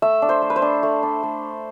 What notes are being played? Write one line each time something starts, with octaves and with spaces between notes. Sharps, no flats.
A3 E5
D4
C5
A3
B4
C5
D4
A3
D4
A3